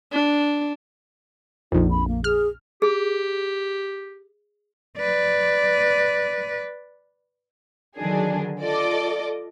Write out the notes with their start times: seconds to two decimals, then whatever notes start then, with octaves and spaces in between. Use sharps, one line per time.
0.12 D4
1.72 A#1 F2 D#4
1.91 B5
2.08 A#3
2.24 G#4 F6
2.82 G4 G#4
4.99 B4 D5
7.97 D3 D#3 F#3 D4 G#4
8.59 F4 A4 D5 D#5 D6